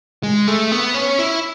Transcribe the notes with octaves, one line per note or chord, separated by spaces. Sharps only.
G#3
A3
B3
C#4
E4